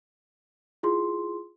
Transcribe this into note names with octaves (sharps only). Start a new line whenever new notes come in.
E4 F4 G#4 C6